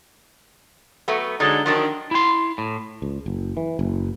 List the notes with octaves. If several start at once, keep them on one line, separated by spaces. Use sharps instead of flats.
F#3 A3 B3
D3 F#3 G#3 D4 D#4
D#3 F3 F#3 D4
E4 C6
A2
C#2
F#1
E3
F#1